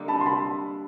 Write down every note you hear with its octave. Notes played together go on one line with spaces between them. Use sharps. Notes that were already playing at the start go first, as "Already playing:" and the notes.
Already playing: D3 G3 A#3 D#4
A5 B5
C6
A5 B5